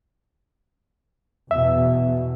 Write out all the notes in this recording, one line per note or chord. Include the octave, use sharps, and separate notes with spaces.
E2 B2 E5